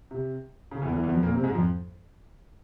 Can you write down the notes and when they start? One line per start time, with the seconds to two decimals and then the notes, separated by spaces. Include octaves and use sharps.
0.11 C3
0.71 C#3
0.82 E2 E3
0.92 E2 E3
1.03 E2 E3
1.13 F2 F3
1.23 A#2 A#3
1.34 C3 C4
1.44 G#2 G#3
1.54 F2 F3